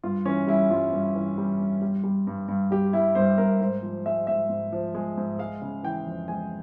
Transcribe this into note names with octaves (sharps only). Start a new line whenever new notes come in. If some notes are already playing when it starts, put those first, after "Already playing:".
G2 F4
E3 C#4
G3 E4
G2 F4
G2
E3
G3
G2
G3
G3
G2
G2
G3 G4
G3 E4
G2 C5
G2 A#4
G#2 C5
F3
G#3 E5
G#2 E5
G#2
F3
G#3
G#2
G#3 F5
C#3
E3 G5
F2
G#3 G#5